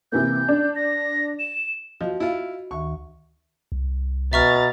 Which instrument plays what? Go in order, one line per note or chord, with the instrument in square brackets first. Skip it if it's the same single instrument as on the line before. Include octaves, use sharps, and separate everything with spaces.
[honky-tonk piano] C3 E3 A#3 [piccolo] G6
[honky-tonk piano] D4
[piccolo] A#6
E7
[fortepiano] F3 [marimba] F#4 D#5
[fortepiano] E4 F4
[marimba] D2 D#3 E5 [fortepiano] C#6
[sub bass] C2
[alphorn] B2 [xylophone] E5 C#6 F6 [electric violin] A#5 A6